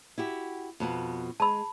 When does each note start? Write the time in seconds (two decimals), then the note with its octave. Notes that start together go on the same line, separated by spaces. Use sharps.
0.18 E4 F#4 G4
0.80 F2 B2 B3
1.40 G#3 A5 B5